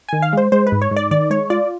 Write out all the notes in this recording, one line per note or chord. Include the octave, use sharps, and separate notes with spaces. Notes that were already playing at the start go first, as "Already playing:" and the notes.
D#3 G#5
F5
G#3 C5
G#3 C5
B4
G#2
C#5
G#2
D5
D#3 D5
G#3 C#5
F4 D5